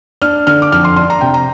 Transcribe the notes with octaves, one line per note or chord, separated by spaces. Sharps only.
D4 F6
D3 F6
D6
F2 F6
C6
D4 C6
A#5
C3 G5
A#5